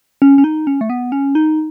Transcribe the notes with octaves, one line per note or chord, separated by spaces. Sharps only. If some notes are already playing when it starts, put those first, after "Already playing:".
C#4
C#4
D#4
C#4
A3
B3
C#4
D#4